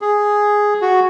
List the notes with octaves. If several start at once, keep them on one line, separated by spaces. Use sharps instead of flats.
G#4
F#4